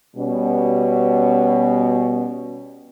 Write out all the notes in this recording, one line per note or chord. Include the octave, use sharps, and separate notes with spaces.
B2 G3 C#4